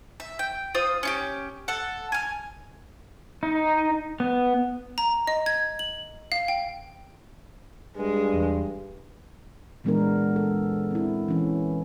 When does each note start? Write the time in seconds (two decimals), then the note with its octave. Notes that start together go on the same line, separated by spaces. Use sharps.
0.20 E5
0.39 G5
0.75 F4 C5 D#6 E6
1.03 C#4 F4 G4
1.68 A4 F#5
2.12 G#5 F6
3.43 D#4
4.20 B3
4.98 A#5
5.27 D#5
5.46 G#6
5.79 F#7
6.32 F5
6.48 G5
7.97 G2 G#3
8.33 E2
9.84 A#2 E3 G#3 B3 D4 A#4
10.36 A4
10.91 C4 E4
11.28 E3 C#4